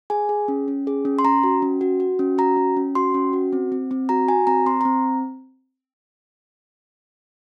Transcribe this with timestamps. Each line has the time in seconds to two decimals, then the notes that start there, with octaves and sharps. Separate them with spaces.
0.10 G#4 G#5
0.29 G#4
0.48 C#4
0.68 C#4
0.87 G#4
1.05 C#4
1.19 C6
1.24 C#4 A#5
1.43 F#4
1.62 C#4
1.81 F#4
2.00 F#4
2.19 C#4
2.38 F#4 A#5
2.57 C#4
2.76 C#4
2.95 F#4 C6
3.14 C#4
3.33 F#4
3.53 C4
3.72 C4
3.91 C4
4.09 F#4 A#5
4.28 F#4 G#5
4.47 C4 A#5
4.66 C4 C6
4.81 A#5
4.85 C4